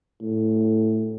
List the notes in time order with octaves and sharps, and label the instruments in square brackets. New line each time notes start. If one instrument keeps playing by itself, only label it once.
[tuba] A2